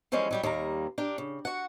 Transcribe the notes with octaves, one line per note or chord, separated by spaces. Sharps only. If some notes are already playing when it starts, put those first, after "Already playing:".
E3 F3 G3 G#3 C#4
F#3 G3 G4
D#2 G3 A#3 A#5
D4 G4 A#4
C#3
F#4 F#5